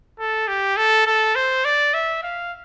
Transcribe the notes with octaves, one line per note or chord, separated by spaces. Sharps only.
A4
G4
A4
A4
C5
D5
E5
F5